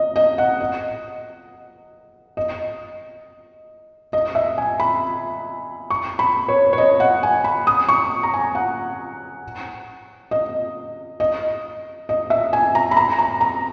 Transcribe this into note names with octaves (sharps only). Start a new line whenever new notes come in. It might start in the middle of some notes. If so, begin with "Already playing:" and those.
Already playing: D#5
D#5
F#5
D#5
D#5
D#5
E5
G#5
B5
C#6
B5
C#5
C#5
D#5
F#5
G#5
B5
D#6
C#6
A#5
G#5
F#5
D#5
D#5
D#5
E5
G#5
A#5
B5
A#5
A#5
A#5